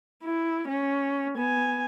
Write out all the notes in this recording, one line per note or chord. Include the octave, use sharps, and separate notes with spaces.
E4
C#4
B3 G#5